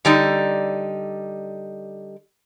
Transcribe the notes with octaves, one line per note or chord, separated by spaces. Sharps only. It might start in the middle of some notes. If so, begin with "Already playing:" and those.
D3 G3 D#4